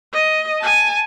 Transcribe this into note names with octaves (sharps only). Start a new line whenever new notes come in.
D#5
G#5 A5